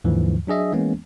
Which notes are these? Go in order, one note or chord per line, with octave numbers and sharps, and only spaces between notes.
D#2 G#2 D3 E3 F3
F#3 D4 G#4 D#5 E5
E3 G#3 A#3 B3 C#4